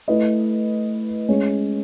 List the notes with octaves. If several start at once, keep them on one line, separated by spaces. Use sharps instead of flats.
A3 E4 B4 D#5
G#3 C#4 G#4 C#5